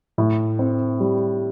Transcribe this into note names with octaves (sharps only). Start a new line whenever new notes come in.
A2
C4
G3